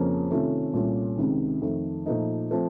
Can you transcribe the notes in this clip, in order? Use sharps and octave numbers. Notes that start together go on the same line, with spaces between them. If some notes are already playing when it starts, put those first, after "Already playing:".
Already playing: F2 C#3 F3 A#3 C#4
C3 D#3 A3 C#4 F4
C2 A#2 A3 C#4 F4
C#2 C3 D#3
F2 D#3 A3
A#2 F3 A3 D#4
F3 A3 C4